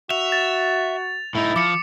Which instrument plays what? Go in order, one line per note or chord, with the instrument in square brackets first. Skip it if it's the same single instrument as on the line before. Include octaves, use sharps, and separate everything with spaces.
[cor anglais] F#4 [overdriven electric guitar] E5 [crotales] F7
[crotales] A6
[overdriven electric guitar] A2 D#4 [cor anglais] E4
[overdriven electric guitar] F3 [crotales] D6 C#7